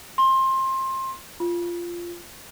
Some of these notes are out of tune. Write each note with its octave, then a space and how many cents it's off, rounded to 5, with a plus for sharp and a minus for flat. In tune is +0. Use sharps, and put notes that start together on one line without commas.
C6 +20
F4 -10